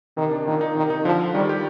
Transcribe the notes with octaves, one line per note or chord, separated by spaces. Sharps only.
C3 D#3
D4
A#2 D#3
D#4
C3 D#3
D#4
D3 F3
F4
D#3 G3
G4